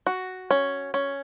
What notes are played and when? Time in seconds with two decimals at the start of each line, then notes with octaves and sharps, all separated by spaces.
0.07 F#4
0.51 C#4
0.94 C#4